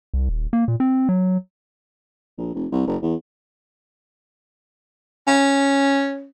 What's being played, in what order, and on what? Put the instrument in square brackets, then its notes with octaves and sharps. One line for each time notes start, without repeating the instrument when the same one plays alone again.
[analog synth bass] C2
D#1
A#3
A#2
C4
F#3
[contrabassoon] A#1
F1
C2
F#1
E2
[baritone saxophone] C#4